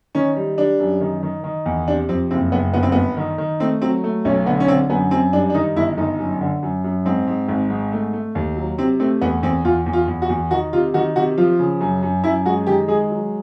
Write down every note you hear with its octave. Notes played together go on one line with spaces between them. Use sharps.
D#3 C#4
G3
G3 D4
F#2
D#3
D#3
D#3
E2
C3 D4
F2 C4
F#1 C4
F#1 B3
G1 B3
C4
G1 B3
D#3
D#3
A3 C4
F#3 C4
A3
B1 C#4
D3 B3
C#4
D3 C4
F#2 B3
F#2 C4
G2 D4
D4
D#3 D#4
G1 E4
G1 D#4
F#2
D3
F#2
F#2
G#2 C4
G#2
G#1
G#2
A3
A3
D#2
F#3
C3 C4
A3 C4
E2 B3
E2 C4
E2 F4
E2
F4
E2
F#4
E2
D#3 F#4
C3 F4
D#3 F#4
C3 F#4
F3 F4
C#3
F#2
F#2
F#2 E4
G#3 F#4
D#3 G4
G#3 G#4
F#3